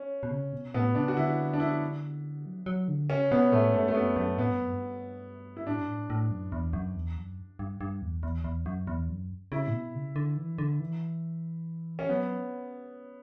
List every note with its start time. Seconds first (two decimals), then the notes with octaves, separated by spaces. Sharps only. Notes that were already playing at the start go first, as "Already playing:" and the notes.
Already playing: C#4
0.23 B2
0.31 C#3
0.53 B2
0.74 A2 B3
0.95 C#3 D4
1.08 F#4
1.16 D3 E4
1.53 D4
1.60 E4
2.46 F#3
2.66 F#3
2.88 D3
3.10 C#3 C#4
3.31 B2 B3
3.52 A2 A3
3.74 G2 A3
3.88 A3
3.95 F#2 B3
4.16 F#2 A3
4.37 A2 B3
4.50 G2
4.61 F#2
4.72 G2
5.57 E4
5.67 A2 D4
5.78 G2
5.87 A2
6.10 A2
6.31 F#2
6.52 E2
6.73 F#2
6.95 E2
7.17 F#2
7.59 G2
7.81 G2
8.02 E2
8.23 E2
8.44 E2
8.66 F#2
8.87 E2
9.09 F#2
9.52 C#3 E4
9.67 A2
9.73 B2
9.95 C#3
10.16 D3
10.37 E3
10.58 D3
10.80 E3
11.99 C#4
12.08 F#3 B3